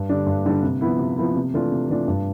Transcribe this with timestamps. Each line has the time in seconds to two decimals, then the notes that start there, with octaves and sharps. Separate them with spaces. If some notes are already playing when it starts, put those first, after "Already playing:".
Already playing: G2
0.09 D3 G3 D4
0.27 G2
0.46 D3 G3 D4
0.63 C3
0.81 F3 B3 E4
0.99 C3
1.17 F3 B3 E4
1.35 C3
1.53 E3 A3 D4 F4
1.72 C3
1.89 E3 A3 D4 F4
2.08 G2